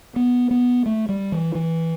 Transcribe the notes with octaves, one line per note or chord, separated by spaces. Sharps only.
B3
B3
A3
G3
E3
E3